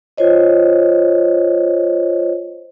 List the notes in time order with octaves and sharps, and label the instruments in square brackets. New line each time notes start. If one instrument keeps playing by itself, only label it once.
[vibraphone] F4 C5 C#5 D#5